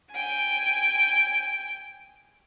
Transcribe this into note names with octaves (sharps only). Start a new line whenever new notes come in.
G5 G#5